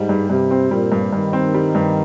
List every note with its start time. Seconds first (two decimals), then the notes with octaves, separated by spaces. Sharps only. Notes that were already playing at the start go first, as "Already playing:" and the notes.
Already playing: G#2 G3
0.09 G2
0.30 G2 C3
0.51 C4
0.71 A#2 G3
0.92 G2
1.13 G2 D#3
1.33 C4
1.54 G3
1.75 G2